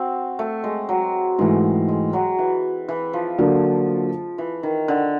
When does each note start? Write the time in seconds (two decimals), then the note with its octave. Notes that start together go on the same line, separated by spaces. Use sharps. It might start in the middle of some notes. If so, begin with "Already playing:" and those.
Already playing: C4 F#4
0.39 A3
0.64 G#3
0.89 F#3
1.38 G#2 E3 G#3 A3
1.89 G#3
2.13 F#3
2.39 E3
2.88 E3
3.13 F3
3.38 D3 F#3 A#3 D4
4.38 E3
4.63 D#3
4.88 D3